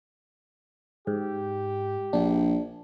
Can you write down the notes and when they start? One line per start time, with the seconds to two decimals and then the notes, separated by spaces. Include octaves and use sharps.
1.07 G#2 G4
2.13 A#1 D4